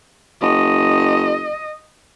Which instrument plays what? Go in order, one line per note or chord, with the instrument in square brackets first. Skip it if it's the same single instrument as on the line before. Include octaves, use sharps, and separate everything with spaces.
[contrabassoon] F#1 [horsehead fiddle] D#5